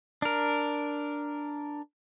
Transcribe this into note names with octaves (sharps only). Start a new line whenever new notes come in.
D4 A#4